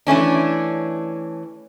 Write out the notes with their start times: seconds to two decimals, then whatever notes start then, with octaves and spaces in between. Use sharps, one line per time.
0.07 E3 A3 C#4 D4